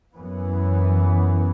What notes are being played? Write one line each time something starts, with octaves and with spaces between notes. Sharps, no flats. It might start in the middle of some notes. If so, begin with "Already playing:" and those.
F#2 E3 B3